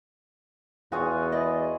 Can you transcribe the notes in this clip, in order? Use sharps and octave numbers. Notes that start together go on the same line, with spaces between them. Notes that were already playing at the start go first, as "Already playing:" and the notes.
E2 F4 F#4 G#4 C#5
E4 D5 D#5